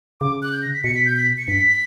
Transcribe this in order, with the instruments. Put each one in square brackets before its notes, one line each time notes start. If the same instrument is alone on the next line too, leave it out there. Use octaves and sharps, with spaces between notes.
[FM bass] C#3 [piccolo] D6
[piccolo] F#6
G6
A#6
B6
[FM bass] B2 [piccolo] C#7
[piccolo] B6
G6
B6
C#7
[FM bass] G2 [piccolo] B6